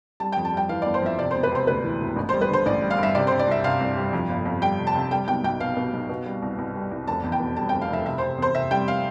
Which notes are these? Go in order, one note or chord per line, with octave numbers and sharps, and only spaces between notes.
G3 A5
G5
F2
A5
G3 G5
E3 F5
D5
G1
C5
F2 E5
C3 D5
C5
E1
B4
C3 C5
D2 B4
E3
E1
A1
C5
G3
B4
D3 C5
A1 D5
G3
F5
G2 E5
C3 D5
C5
C3
D5
C2 E5
C3 F5
C2
G3
F2
G1
F2
G3 G5
C3
A5
C3
G3 G5
B1 G5
B1 G5
B2 F5
B2
B1
B2
G3
C2
C2
G3
C2
F1 A5
E2
G5
B2
G3 A5
G5
F1
F5
F1 E5
C3 E5
C5
C3
E2 C5
C3 E5
G3 G5
F5